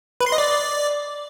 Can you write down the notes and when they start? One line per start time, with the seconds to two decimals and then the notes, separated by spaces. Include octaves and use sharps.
0.20 B4
0.26 C6
0.32 D#5
0.38 D5